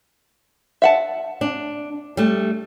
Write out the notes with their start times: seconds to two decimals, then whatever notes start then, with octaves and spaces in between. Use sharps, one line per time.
0.82 E5 F#5 A5
1.41 D4
2.17 G3 A3